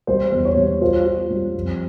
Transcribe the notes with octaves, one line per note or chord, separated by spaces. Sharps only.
G3 C5
E2
C#5
G3
F4 C5
F4
G3
F2